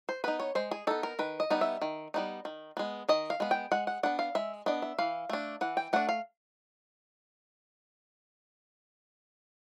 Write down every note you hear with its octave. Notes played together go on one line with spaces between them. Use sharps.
C5
B3 D#4 B4
C#5
G#3 C5
G#4
B3 D#4 A4
A#4
D#3 B4
D#5
G3 B3 D#4
E5
D#3
G3 B3 D#4
D#3
G#3 B3
D#3 D#5
F5
G#3 B3
G5
G#3 F#5
F#5
B3 D4 F#5
F5
G#3 E5
B3 D4 D#5
E5
E3 F5
A3 D4
E3 F#5
G5
A3 D4 F#5
F5